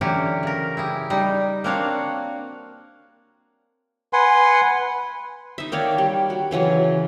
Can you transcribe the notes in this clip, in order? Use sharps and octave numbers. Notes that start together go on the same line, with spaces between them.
D3 E3 F#3 C#4 G4
C#3 A#4
E4 G4 G#4
G3 D#4
A#3 C4 D4 F#4 C#5 F5
B4 F#5 G#5 C6
D#4 E5
D#3 A#3 C#5 D5
G3
F#4
C#3 E3 F#3 C#5